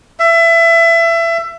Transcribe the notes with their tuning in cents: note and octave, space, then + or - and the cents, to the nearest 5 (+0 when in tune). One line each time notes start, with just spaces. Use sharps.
E5 +25